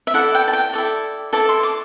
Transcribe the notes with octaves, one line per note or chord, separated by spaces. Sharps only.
E5
E4 A4 D5 F#5
G5
A5
G5
E4 A4 D5
E4 A4 D5 A5
C6
D6